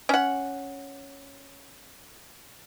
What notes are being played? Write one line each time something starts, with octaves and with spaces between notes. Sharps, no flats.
C#4 F#5